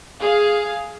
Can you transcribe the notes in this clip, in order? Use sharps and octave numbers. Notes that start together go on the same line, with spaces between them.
G#4 F5